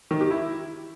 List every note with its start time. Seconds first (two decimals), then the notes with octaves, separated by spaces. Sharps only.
0.11 D#3
0.21 G4
0.31 E4